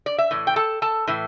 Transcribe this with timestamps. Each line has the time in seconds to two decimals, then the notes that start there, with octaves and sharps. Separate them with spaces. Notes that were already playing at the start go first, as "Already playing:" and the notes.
0.06 D5
0.18 E5
0.31 A2 E3
0.47 G5
0.56 A4 A5
0.82 A4 A5
1.07 A2 E3